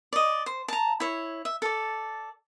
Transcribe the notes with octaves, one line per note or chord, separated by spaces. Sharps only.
D5 D#5
C5
A5 A#5
E4 C#5
E5
A4 D5